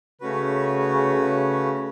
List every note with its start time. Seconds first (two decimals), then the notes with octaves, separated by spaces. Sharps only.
0.21 C#3 A3 C#4 F#4 B4
1.14 C#3